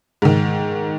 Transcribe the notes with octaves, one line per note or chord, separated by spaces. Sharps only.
G#2 D#3